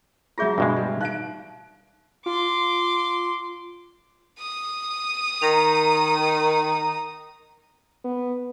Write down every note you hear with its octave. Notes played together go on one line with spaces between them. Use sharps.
F#3 F4 G#4 E5 G6 A#6
G2 B2 G#3
G3
D#4 F5 F#6 D7
F4 C6 D6
D#6
D#3 A#5
B3